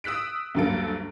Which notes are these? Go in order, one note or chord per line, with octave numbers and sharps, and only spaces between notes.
D#6 E6 F#6 B6 D7
D2 G2 F#3 A#3 A4 D7